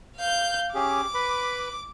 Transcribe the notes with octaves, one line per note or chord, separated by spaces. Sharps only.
F5 G6
C#4 G4 G#4 D6
B4 B5